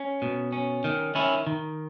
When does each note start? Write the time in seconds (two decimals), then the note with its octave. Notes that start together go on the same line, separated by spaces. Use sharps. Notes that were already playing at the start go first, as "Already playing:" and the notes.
Already playing: C#4
0.22 B2
0.52 C#4
0.84 D#3
1.15 D#3 C#4 E4
1.47 D#3